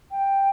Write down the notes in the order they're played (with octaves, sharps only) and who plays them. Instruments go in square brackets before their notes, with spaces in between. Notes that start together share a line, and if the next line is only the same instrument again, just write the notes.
[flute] G5